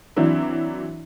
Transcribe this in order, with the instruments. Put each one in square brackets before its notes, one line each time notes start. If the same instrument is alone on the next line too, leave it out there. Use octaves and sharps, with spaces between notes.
[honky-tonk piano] E3 F#3 C4 D4 E4